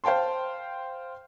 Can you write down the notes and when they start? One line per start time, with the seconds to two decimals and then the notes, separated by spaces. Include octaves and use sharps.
0.04 C5 F5 G5 A5 C6